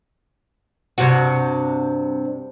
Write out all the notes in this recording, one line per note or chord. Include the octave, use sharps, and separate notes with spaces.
G2 C3 F#4